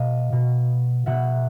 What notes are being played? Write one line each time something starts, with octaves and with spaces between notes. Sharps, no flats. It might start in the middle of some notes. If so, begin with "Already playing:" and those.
Already playing: B2 D#5 F5
B2
B2 E5 F#5